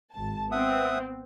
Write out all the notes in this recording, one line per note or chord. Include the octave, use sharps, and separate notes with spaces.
G#1 A5
B3 C4 E5 F#5 D#6